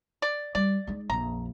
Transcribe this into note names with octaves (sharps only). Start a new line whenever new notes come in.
D5
G3 D5
G#3 D#4
A#1 F2 A#5